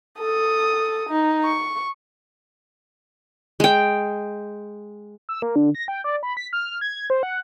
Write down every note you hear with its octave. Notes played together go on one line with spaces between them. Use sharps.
A4 D#6
D#4
C#6
G#3 G5
E6
A#3
D3
A#6
G5
D5
B5
B6
F6
G#6
C5
F#5